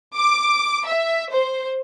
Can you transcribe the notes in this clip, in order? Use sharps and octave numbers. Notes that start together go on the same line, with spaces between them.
D6
E5
C5